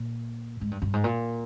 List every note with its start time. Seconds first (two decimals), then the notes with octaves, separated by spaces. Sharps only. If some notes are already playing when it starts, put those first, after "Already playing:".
Already playing: A#2
0.61 G#2
0.71 G2
0.82 G2
0.94 G#2
1.04 A#2